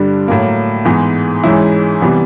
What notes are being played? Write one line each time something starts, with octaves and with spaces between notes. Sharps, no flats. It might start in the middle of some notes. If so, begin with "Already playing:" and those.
Already playing: G2 D3 G3
A2 F#3 A#3
G#2 E3 G#3 B3
G#2 E3 G#3 C#4 E4
C3 E3 G3 B3